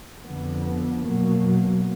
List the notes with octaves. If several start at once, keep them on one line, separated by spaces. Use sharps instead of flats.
F2 D3 F3 B3
B2 F#3 A#3